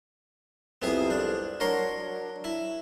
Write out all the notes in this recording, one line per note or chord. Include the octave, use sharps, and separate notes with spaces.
C2 F2 B3 E4 G#4
D4
F#3 D4 A#4 C#5 C6
E4